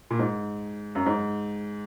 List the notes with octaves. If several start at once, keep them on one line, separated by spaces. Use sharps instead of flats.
A#2
G#2
F#2
G#2